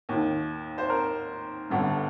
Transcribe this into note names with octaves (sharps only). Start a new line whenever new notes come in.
D#2 D#3
C5
A#4
G1 G2 D3